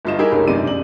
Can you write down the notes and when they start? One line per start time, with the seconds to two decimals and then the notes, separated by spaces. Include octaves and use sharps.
0.05 G1 G2 F4 D#5 E7
0.18 D#4 E4 G4 G#4 A#4
0.31 F1 B1 C#4 A#4
0.48 G1 F#2 C3 D#4 D5 D#7
0.67 F#7